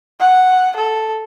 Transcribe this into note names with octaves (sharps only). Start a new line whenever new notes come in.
F#5
A4